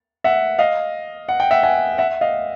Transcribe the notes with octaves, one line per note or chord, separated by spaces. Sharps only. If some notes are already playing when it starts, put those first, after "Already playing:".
E5 F#5
D#5 F5
F#5
G5
E5 F#5
F#5 G#5
E5 F#5
D#5 F5